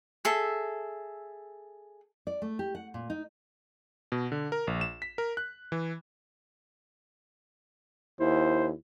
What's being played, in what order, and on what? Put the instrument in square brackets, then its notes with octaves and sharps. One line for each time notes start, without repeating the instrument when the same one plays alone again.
[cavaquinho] G#4 A4 E5
[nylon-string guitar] D5
A3
G4
F#5
A#2
D#4
[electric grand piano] B2
D3
A#4
A#1
E7
B6
A#4
F#6
E3
[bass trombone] D#2 [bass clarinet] E4 [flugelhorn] C5